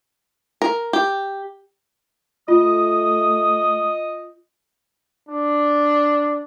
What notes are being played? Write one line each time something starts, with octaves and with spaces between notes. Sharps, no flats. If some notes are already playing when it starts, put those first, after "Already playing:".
A#4
G4
A3 F4 D#5 D#6
D4